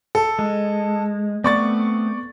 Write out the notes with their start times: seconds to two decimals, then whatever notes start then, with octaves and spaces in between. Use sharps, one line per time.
0.15 A4
0.39 G#3
1.44 A3 B3 C4 D5 C#6 A6